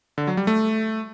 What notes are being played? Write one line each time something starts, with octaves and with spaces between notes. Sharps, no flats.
D3
F#3
G3
A3